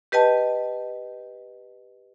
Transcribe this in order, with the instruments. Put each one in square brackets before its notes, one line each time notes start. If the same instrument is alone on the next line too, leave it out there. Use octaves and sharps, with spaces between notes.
[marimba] G4 B4 D#5 G5 A5